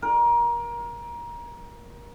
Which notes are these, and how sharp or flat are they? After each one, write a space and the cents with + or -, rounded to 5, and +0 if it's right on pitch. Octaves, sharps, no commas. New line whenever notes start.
A#4 +25